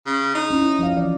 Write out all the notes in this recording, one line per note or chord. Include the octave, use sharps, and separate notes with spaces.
C#3
D#4
C#4 E4
F3 D#5 F5
E3 F3 D5